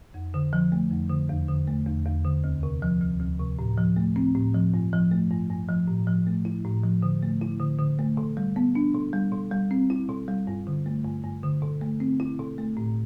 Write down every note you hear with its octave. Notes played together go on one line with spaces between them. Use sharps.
F2
D3
F3
A3
F2
D3
E2
D3
A3
E2
E2
D3
D2
C3
F3
D2
D2
C3
A2
F3
A3
C4
A2
F3
G2
F3
A3
G2
G2
F3
A2
F3
A3
E4
A2
F3
D3
A3
E4
D3
D3
A3
B2
G3
B3
D4
B2
G3
B2
G3
C4
E4
B2
G3
G2
D3
A3
G2
G2
D3
B2
A3
C4
E4
B2
A3
A2